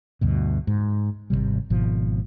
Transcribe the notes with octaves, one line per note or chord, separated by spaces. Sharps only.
D2 G2 B2
G#2
G#1 D2 C3 G3
G#1 B2 F3